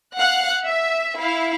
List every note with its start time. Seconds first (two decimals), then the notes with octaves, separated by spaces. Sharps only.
0.16 F5 F#5 F#6
0.64 E5
1.18 E4 F5